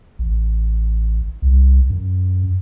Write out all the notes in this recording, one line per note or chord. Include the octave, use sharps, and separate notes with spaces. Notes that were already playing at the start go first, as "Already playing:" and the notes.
A1
C2
F#2